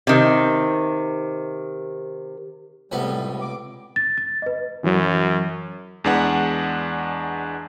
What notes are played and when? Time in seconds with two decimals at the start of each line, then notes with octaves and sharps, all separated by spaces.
0.07 C3 D#3
2.92 C#2 A2 C3 G3 B3
3.41 D6
3.96 A6
4.18 A6
4.42 B4 D#5
4.84 F#2 E3 F#3
6.04 E2 G#3 D4 B4 F#5